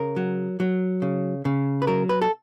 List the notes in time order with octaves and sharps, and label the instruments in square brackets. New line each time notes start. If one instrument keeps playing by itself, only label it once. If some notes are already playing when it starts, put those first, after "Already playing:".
Already playing: [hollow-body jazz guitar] C#3 A#4
F#3
F#3
C#3
C#3
B4
F#3 A#4
B4
A4